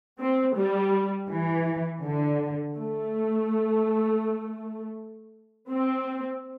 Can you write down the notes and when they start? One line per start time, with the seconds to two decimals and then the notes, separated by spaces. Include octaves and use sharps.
0.19 C4
0.55 G3
1.29 E3
2.02 D3
2.76 A3
5.71 C4